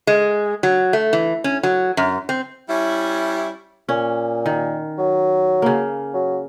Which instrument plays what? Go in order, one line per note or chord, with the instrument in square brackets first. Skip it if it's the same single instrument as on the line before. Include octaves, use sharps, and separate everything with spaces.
[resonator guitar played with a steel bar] G#3
F#3
A3
E3
C#4
F#3
F#2
C4
[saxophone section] G3 C#4 E4
[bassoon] A#2 [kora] C#4
[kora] D#3
[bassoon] F#3
[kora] C#3 A#3
[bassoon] F#3